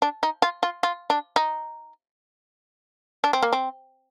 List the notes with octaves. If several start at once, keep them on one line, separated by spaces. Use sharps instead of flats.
D4
D#4
F4
F4
F4
D4
D#4
D4
C4
A#3
C4